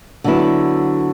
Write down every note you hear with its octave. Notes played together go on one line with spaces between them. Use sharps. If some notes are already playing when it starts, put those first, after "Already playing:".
D3 F#3 B3 E4